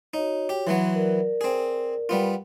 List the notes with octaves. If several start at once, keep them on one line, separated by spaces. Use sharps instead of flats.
D#4 F#4 C#5
G4
E3 F#3 B3 C6
A#4 D5
C4 G#4
G3 B3 F4